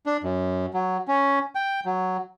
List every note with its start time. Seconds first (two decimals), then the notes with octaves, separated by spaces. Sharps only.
0.06 D4
0.24 F#2
0.74 F#3
1.08 C#4
1.55 G5
1.85 F#3